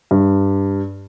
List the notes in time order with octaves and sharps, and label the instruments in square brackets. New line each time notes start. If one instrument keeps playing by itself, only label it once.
[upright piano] G2